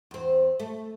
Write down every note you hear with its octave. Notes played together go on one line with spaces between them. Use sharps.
E2 C4
A3